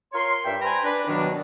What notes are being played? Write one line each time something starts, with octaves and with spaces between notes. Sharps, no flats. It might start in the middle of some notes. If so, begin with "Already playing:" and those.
F4 A#4 C#5 C6
G2 E5 G5
B4 C5 G5 G#5 A#5 B5
D4 B4
G2 B2 D#3 F#3 D4